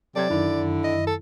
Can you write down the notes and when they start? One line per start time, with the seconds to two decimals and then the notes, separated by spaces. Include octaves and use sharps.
0.16 C3 F#3 A4 D5 G#6
0.30 F#2 D3 D#3 E4
0.84 D#5
1.07 A4